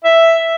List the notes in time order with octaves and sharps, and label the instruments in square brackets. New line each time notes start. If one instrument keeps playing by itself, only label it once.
[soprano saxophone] E5